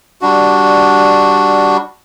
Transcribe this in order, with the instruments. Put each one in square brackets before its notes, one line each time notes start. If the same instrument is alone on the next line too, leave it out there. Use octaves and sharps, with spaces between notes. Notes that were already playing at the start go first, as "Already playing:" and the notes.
[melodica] G3 D4 F#4